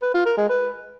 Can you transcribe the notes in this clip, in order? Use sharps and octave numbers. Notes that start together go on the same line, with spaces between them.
B4
F4
A#4
G#3
B4